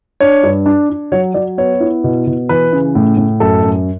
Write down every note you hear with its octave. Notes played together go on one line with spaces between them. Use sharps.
D4 C#5
G2
D4
D4
F#3 C#5
F#3 D5
B3 C#5
E4
B2
B2
E3 B4
C#3
A2
A2
F#2 A4
F#2